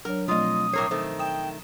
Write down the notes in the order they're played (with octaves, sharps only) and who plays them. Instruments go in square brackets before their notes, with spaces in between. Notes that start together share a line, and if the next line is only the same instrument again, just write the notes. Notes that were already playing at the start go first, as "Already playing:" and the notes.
[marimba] F#3 D4 C#5 [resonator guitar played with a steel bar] A#4
[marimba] B2 F3 C4 [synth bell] F#3 A3 [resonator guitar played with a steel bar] F4 D#5 [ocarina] D#6
[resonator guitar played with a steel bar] A2 A#4 C#5 [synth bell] D6 C7
[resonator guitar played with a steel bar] D#3 A3 [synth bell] C5
[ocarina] G5 [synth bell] D#6 E7